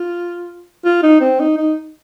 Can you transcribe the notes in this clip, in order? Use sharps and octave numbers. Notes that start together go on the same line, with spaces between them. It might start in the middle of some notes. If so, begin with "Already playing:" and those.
Already playing: F4
F4
D#4
C4
D#4
D#4